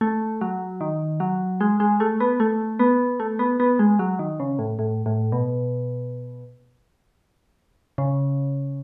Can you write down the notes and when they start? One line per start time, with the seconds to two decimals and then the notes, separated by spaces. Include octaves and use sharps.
0.01 A3
0.41 F#3
0.81 D#3
1.20 F#3
1.61 G#3
1.80 G#3
2.00 A3
2.20 B3
2.40 A3
2.79 B3
3.20 A3
3.39 B3
3.60 B3
3.79 G#3
3.99 F#3
4.19 D#3
4.40 C#3
4.59 A2
4.79 A2
5.06 A2
5.32 B2
7.98 C#3